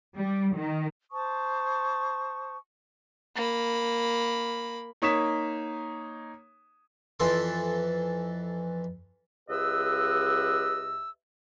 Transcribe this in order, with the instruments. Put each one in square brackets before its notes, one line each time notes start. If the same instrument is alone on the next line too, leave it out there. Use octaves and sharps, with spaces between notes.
[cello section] G3
D#3
[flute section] C5 A5 C#6 D#6
[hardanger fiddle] A#3 B5
[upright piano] A#3 D#4 C#5 D#6 B6 E7
[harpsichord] F2 E3 A4 C6
[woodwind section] C#2 G4 B4 D#5 E5 E6